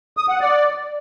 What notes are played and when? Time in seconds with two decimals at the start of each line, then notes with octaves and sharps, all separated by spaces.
0.17 D#6
0.29 F#5
0.41 D5